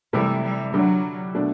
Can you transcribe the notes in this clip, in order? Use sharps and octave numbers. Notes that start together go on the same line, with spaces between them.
C3 E3 G3 A3 E4
G3
D3 F#3 G3 D4
B2 A3 D4